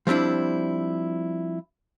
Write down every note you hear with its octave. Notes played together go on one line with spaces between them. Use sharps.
F3 G3 C4 D4 E4